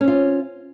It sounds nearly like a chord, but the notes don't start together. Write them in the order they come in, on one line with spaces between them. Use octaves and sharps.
C#4 C4 F4